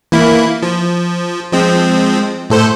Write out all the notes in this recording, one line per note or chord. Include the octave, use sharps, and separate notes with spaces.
E3 A#3 E4
F3
F3 G#3 C4
A2 A4 C5